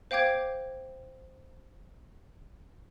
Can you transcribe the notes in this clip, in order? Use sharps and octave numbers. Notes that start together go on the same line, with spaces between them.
C5 F5 G5 D6 G#6